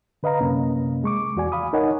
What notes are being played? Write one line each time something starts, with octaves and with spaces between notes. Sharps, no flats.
D3 B4 D#5 F5 A#5
F#2 C3 A#3 C#4
G#3 C#6 D6
E2 F#4 D5 G#5
F5 B5 D#6
D#4 A#4 C#5 D#5 F#5 G#5